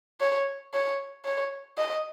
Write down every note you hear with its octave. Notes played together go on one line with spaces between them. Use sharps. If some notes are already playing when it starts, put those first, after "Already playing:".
C#5
C#5
C#5
D#5